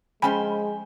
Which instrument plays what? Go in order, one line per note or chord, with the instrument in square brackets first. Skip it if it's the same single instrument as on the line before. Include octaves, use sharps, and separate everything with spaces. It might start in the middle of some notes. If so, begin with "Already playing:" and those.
[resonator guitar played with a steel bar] F3 C#4 C5 [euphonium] G#3 [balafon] G5 G#5 B5